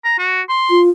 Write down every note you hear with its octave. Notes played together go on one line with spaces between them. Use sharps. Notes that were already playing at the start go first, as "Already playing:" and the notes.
A#5
F#4
C6
F4